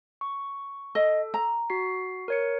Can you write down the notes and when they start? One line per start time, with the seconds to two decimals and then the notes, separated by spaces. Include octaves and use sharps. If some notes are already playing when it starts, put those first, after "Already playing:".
0.21 C#6
0.95 A4 D#5
1.34 A#5
1.70 F#4 C7
2.28 A#4 C#5 C#7